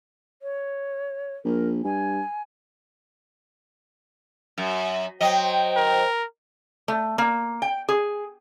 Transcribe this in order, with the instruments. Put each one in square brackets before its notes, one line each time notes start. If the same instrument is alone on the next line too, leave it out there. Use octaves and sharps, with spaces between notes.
[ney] C#5
[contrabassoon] A#1 [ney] A#4
[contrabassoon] G2 [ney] G#5
[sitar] F#2
[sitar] F#3 D#5 [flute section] C5 G5
[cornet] A#4
[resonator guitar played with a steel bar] A3
A#3
G5
G#4